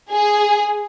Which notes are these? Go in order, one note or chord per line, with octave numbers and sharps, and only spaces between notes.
G#4